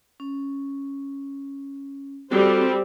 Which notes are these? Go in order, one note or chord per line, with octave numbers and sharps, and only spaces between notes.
C#4
G3 C4 F#4 A4 C5 D6